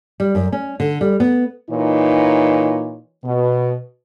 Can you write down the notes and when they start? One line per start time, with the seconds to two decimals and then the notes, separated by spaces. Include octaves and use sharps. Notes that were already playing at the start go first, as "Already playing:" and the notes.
0.20 G3
0.35 F#2
0.52 C#4
0.80 D3
1.01 G3
1.20 B3
1.70 A#2 E3 D#4 C#5
3.24 B2